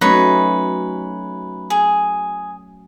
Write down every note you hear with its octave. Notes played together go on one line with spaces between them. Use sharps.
F#3 A3 C#4 D#4 B4 C#5
G#4